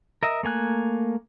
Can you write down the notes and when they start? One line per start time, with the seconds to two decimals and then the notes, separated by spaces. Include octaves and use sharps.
0.23 A#4 D#5 E5
0.43 A3 A#3 G#5 F#6